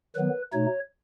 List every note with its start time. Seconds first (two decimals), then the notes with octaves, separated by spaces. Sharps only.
0.15 D#3 F#3 B3 B4
0.53 B2 A3 D#4 C#5